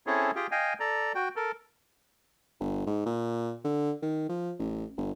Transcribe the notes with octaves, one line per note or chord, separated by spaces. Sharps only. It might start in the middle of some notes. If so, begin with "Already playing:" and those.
C4 C#4 E4 G#4 A4 C#5
F4 G4 G#4 G5
D#5 F5 G5 G#5
A4 D5 A#5
F#4 G5
A4 A#4
G1
G#2
A#2
D3
D#3
F3
A1
G1